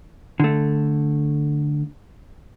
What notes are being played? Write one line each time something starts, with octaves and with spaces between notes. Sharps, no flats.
D3 A3